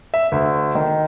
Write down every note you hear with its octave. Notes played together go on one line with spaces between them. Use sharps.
E5
D2
D#3